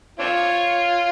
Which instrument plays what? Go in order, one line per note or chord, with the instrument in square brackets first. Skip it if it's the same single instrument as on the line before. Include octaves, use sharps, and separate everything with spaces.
[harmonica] C4 D4 F4 [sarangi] C#5